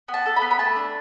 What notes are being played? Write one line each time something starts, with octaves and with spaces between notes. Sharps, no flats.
B3
A5
A4
B5
B3
B5
A3 A5
D4